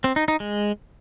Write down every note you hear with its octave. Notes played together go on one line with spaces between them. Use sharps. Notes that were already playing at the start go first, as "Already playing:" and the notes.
C4
D#4
D#4
G#3